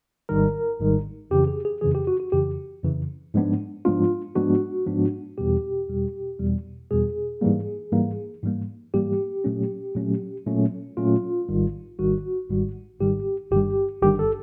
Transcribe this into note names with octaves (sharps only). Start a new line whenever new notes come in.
G#1 G#2 D#3 G3 A#4
G#1 G#2 D#3 G3
F2 C#3 E3 G4
G#4
G#4
F2 C#3 E3 G#4
G4
F#4
F#4
F2 C#3 E3 G4
F2 C#3 E3
G#2 F3 G#3 B3 D4
G#2 F3 G#3 B3 D4 F4
G#2 F3 G#3 B3 D4 F#4
G#2 F3 G#3 B3 D4
E2 B2 G3 G4
E2 B2 G3
E2 B2 G3
E2 B2 G3 G#4
G#2 E3 G3 A#3
G#2 E3 G3 A#3
G#2 E3 G3 A#3
G#2 E3 G3 A#3 G4
A#2 F#3 A3 C#4
A#2 F#3 A3 C#4
A#2 F#3 A3 C#4
A#2 F#3 A3 C#4 F4
G#1 G#2 D#3 G3
G#1 G#2 D#3 G3 F#4
G#1 G#2 D#3 G3
G#1 G#2 D#3 G3 G4
G1 G2 D#3 G3 G4
G1 G2 D#3 G3 G4
A4